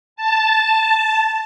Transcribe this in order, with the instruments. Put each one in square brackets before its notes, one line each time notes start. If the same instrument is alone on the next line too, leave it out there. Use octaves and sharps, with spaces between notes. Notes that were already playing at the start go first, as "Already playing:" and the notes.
[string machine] A5